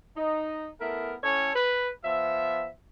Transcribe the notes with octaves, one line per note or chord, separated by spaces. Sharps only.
D#4
A3 B3 E4 A#4
A2 C#4 A4 C#5
B4
F3 B3 E5